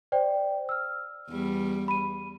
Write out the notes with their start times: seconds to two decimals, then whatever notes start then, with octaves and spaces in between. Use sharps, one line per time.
0.12 C5 D5 G5
0.69 E6 F6
1.29 E2 G3
1.88 B5 D#7